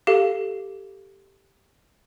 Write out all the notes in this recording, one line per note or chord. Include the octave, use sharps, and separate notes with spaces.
G4 A4 F5